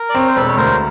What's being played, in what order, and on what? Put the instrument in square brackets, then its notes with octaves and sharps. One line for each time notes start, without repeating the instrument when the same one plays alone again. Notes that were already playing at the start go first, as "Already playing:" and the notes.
Already playing: [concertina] A#4
D5
[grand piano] C4 [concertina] C#5
[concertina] C5
[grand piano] E1 [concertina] A4 B4
[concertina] C#5
[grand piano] D2 [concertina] A#4 C5